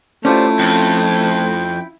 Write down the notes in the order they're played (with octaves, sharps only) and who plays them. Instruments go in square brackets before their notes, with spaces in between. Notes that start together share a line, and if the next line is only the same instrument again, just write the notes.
[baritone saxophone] A3 [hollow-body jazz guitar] C#4 E4 F4 [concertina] G4 C5 D5
[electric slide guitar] F2 [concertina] G5